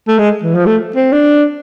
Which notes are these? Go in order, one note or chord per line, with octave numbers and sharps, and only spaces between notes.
A3
G#3
E3
F3
A3
C4
D4